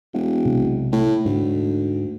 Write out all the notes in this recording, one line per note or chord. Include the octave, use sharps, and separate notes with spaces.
E1
B1 C3 G#3
A2
D2 G#2